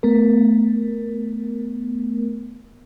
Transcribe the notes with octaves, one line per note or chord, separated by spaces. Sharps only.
A3 B3 A#4